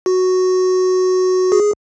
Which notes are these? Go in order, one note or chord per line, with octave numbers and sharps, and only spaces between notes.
F#4
G#4